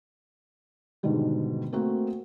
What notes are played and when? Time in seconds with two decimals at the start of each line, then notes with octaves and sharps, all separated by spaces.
1.03 G#2 B2 D3 D#3 G3
1.73 A3 A#3 C4 F#4 A#4